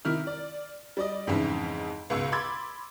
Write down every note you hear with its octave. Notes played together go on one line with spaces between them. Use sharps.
C3 D#3 E4 F6
D5
G3 D5 D#5
F2 G#2 C#3 E3 D#4 E4
C#2 G#2 B2 E6
B5 C6 D6 E6 G#6 A6